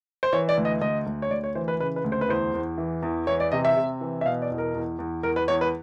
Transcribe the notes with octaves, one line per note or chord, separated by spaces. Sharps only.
C5
E3 C#5
D5
D2
D#5
D2 D#5
D2
C#5
D2 D5
C#5
E3 C5
B4
C#3 B4
B4
D2
C5
B4
E2 C5
E2
E3
E2
E3 C#5
D5
C3 D#5
E5
C3
E3
E5
B2 F5
D5
E2
A#4
E2
E2
E2 A#4
B4
E2 C#5
B4